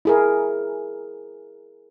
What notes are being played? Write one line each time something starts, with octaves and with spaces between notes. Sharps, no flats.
E4 G#4 A#4